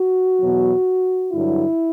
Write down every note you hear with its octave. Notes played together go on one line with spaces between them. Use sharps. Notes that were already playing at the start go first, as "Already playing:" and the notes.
Already playing: F#4
E2 B2 F#3
G2 D3 F#3 E4